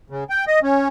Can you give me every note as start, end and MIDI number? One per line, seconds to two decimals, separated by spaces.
0.10 0.24 49
0.30 0.45 79
0.47 0.60 75
0.63 0.88 61